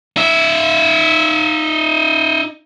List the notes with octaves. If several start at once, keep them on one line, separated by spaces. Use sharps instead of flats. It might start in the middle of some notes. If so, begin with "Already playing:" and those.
D#4 E5